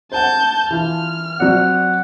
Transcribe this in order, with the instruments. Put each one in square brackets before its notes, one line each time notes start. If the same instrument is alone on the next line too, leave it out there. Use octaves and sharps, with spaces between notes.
[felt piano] C5 F#5 [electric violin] A5 G6
[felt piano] E3 F4 [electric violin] F6
[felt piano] F#3 C4 D5 [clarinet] F#5